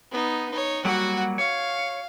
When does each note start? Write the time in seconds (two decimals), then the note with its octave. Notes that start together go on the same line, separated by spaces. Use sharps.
0.11 B3 D#4
0.51 D#4 C#5
0.85 F#3 G3 A#3 F#4 F#5
1.38 C#5 F5